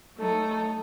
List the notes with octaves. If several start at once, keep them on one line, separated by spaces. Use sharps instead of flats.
F#3 A3 D#4 A4